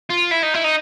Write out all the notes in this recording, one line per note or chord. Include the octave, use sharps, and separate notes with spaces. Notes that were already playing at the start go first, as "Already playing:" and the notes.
F4
E4
D#4
E4
D#4